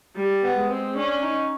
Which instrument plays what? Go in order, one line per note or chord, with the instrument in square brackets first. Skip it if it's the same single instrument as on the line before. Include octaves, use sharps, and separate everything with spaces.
[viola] G3
[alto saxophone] B3
[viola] G#3
[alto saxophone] C4
[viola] C#4 [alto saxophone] D4
[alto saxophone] D#4